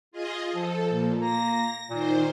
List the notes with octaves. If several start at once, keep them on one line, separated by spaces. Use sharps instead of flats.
F4 G#4 D#5
F3 A4
A#2
A#3 A#6
A#2 D#3 C5